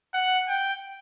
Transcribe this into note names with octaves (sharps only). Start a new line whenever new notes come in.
F#5
G5